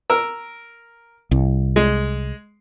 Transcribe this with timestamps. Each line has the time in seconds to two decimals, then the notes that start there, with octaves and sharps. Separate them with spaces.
0.10 A#4 E6
1.31 C2
1.76 G#3